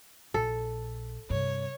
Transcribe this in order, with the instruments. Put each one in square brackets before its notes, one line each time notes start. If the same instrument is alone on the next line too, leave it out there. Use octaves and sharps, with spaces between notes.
[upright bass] A#1 [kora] A4
[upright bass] G2 C3 [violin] C#5